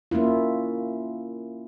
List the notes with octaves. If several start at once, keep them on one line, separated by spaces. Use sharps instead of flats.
A#3 C#4 E4 F4